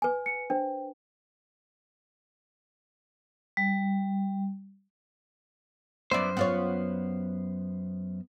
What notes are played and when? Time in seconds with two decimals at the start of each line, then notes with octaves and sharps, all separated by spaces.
0.02 B4 G#5
0.26 C#7
0.50 D4 B4 C5 G5
3.57 G3
6.11 F#2 B3 E4 C5 D5
6.37 B3 F4 C#5